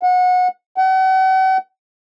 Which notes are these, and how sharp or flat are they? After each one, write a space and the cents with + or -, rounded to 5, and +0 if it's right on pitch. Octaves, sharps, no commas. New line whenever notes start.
F#5 -25
F#5 +40